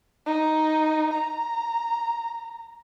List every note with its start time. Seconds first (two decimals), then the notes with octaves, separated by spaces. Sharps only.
0.26 D#4
1.14 A#5